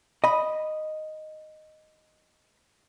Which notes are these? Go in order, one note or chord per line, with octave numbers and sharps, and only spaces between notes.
D#5 B5